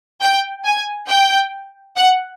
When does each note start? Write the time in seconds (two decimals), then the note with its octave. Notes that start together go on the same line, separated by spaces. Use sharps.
0.21 G5
0.65 G#5
1.09 G5
1.97 F#5